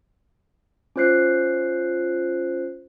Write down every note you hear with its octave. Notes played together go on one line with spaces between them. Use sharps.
C#4 F4 C5 F#6 C7